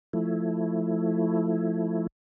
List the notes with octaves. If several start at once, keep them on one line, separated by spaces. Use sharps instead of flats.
F3 A3 E4